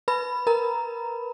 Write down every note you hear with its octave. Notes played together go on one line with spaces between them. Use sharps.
B4 B5
A#4 A#5